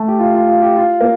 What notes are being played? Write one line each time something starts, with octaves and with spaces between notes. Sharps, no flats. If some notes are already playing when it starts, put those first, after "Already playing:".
Already playing: A3
G4
F4
F4
F4
G4
F4
A#3